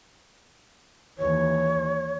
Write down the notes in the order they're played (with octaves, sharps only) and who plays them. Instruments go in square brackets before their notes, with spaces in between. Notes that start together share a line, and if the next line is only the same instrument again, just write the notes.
[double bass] D#2 E3 [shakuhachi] C#5